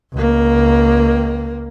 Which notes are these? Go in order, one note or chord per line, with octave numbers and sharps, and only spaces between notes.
C#2 A#3